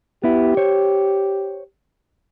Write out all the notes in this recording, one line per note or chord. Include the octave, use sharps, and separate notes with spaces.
B3 E4 G4
C5 C#5